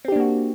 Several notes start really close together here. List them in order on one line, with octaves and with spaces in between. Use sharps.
C4 G4 D4 A#3 F#4